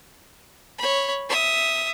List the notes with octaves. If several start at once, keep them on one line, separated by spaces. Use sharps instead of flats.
C#5 B5
E5 D#6